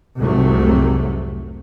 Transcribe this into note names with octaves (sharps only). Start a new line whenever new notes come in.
F1 C2 G#2 C3 F#3 A3